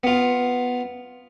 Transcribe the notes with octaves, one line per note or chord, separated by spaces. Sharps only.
B3 F4